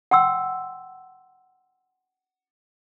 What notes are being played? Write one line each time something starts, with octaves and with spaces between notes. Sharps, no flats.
F#5 G5 C6 E6